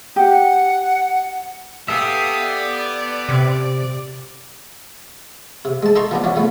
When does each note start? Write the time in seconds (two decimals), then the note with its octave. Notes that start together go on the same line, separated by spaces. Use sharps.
0.16 G4 F#5
1.88 B3 G4 A4 E5 F5 D#6
2.41 D5
3.29 C3
5.65 C3
5.83 G#3 A5
5.96 D#4 A4 A5 A#5 C6 C#6
6.11 F3 B3 D4
6.24 E3 F#3 C#4
6.36 F3 A3 B3